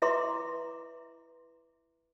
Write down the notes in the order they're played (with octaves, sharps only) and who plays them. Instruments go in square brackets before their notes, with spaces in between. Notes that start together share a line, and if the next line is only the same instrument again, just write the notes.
[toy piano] E4 B4 E5 A#5 C6 D6